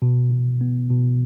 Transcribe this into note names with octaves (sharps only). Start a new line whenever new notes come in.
B2
B2
B3
B2